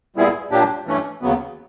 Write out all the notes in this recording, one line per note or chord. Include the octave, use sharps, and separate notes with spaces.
A#2 G3 B3 E4 G#4
A#2 F#3 A#3 D4 G4
G2 E3 A3 C#4
D#2 C#3 F#3 B3